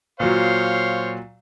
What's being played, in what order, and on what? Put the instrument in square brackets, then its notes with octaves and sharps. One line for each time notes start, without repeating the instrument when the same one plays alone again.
[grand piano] A#2 F#3 [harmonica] C5 C#5 F5